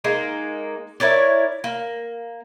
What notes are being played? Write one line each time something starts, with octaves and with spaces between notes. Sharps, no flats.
G#3 A#3 D#4
E4 A#4 C#5 D5
A#3